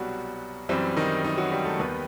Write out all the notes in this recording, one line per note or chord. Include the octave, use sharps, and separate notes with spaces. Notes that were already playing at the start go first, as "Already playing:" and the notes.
Already playing: C2 B2 F#3 G3 F#4
F#2 E3 G3 C4
D#3 D#4
D#3 D#4
F#3 F#4
G3 G4
A3 A4
D#2 D#3 G3 B3 B4